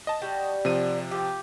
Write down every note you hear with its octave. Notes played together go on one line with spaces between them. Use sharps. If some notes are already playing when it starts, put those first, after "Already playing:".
D#5 A5
G3 F#4
C3 F3 D#7
F4 G4